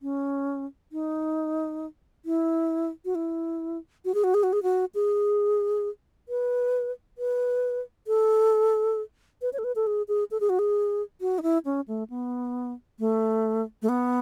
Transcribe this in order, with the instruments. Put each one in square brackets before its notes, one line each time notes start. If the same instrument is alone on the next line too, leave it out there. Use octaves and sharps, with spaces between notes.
[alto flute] C#4
D#4
E4
F#4
E4
F#4
G#4
F#4
G#4
F#4
G#4
F#4
G#4
B4
B4
A4
B4
C#5
A4
B4
A4
G#4
G#4
A4
G#4
F#4
G#4
F#4
D#4
E4
C#4
A3
B3
A3
A3
B3